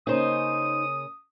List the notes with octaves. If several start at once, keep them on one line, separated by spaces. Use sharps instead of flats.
C#3 A#3 C#4 D#4 C5 D#6